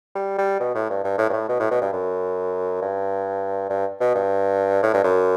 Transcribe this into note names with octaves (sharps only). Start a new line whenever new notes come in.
G3
G3
B2
A2
G2
G2
A2
G2
A2
B2
A2
B2
G2
F#2
G2
G2
B2
G2
A2
G2
F#2